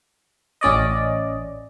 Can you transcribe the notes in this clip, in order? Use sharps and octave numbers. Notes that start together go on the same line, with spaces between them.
A1 C#4 D5 D#5